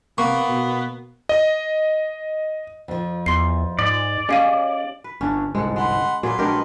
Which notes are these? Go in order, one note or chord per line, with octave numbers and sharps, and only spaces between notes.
C3 A#3 B3 C#6
B2
D#5
F2 F3
E2 C6 C7
G#2 D5
C#4 G4 G#4 D#5 F5 D#7
B4
G1 C#4 D4
G1 C2 G#2 G#3 A4 F#5
G#3 F#5 B5 C6
A#2 F#3 A#3 G#4 B4 C6
A#1 G#3 D4 G4 A#4 C#5